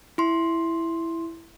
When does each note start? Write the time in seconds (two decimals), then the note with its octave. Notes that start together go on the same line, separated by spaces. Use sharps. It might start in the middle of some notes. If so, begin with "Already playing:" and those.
0.18 E4 C6